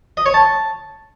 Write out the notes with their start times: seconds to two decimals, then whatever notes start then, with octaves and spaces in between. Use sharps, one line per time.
0.17 D#5
0.26 C#5
0.34 A5